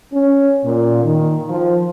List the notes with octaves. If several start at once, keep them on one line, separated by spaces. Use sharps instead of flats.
C#4
A#2
D#3
F3